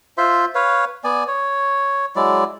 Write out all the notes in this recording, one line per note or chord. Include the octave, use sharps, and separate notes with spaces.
F4 C5 E5 C6
B4 C#5 F5
B3 D5 G#5
C#5
F#3 G#3 E4 D5